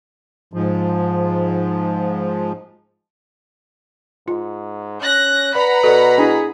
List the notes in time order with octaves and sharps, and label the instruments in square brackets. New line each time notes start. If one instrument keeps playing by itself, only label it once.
[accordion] G#2 F3
[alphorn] G#2 [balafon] F4
[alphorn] C#4 [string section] F#6 A#6
[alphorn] B4 [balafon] D5 [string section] F#5 A#5 B5
[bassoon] B2 [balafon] A4 D5
[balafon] D4 E4 [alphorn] G#4